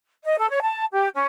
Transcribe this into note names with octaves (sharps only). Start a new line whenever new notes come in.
D#5
A4
C#5
A5
G4
C#4